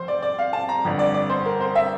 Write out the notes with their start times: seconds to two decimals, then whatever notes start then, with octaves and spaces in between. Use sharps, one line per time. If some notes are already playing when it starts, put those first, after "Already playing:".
Already playing: F1 C5
0.08 D5
0.22 D5
0.39 F5
0.53 A5
0.69 A#5
0.84 G1 F2 D3
0.99 D5
1.14 D5
1.30 C5
1.46 A#4
1.61 C5
1.76 E5